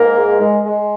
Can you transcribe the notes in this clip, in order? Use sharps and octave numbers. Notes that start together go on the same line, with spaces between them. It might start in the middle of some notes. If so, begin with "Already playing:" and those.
Already playing: G#2 A#3 A#4
G#3
G#3
G#3